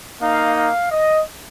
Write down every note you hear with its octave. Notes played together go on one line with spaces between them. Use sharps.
A#3 D#4 F5
F5
D#5